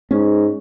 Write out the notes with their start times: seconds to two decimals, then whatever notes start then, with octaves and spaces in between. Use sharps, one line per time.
0.11 G#2 C#4